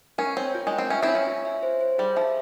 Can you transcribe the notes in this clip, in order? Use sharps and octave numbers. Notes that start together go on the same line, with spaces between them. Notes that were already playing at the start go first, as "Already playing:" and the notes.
C#4 A#4
C4 C#5
F4
G#3
G5
C4
C#4 E5
C4 E4
C#5
C#4
F4
E5
C5
C5
G3 G#4
F3 E5